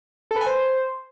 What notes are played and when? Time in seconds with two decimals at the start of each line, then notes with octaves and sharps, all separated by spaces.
0.31 A4
0.36 B4
0.41 G#5
0.46 C5